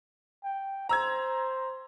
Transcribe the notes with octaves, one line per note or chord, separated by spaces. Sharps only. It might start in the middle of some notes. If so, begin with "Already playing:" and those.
G5
C5 A#5 E6 G#6